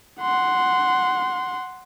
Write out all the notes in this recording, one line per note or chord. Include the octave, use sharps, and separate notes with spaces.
F#5 C6